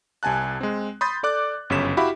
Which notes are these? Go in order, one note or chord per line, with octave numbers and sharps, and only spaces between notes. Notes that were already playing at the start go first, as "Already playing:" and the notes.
C2 C3 G#5 A5 F#6
G#3 C4
B5 C6 D#6 G6 A6
A4 D5 D6 F#6
G1 F#2 C#3 C#5 B6 E7
E4 F#4 G4 E5 F5 B5